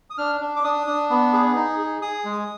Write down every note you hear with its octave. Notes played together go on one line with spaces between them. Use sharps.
D#6
D4 F6
D4
D6
D4 D#6
D4
B3
G#4
D#4
G#4
G#4 D#6
G#3